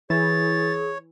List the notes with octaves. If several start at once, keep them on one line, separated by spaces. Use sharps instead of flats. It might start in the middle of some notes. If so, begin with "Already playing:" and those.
E3 G#4 C#5 A6